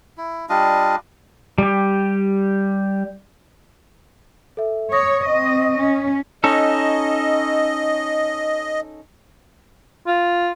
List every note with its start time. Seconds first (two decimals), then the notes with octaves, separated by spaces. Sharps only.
0.18 E4
0.49 G3 D4 F4 D#5
1.58 G3 G4
4.57 A4 E5
4.92 C#5 C#6 D#6 A#6
5.26 C4 D#5
5.77 C#4
6.44 C#4 D#4 A4 D#5
10.07 F4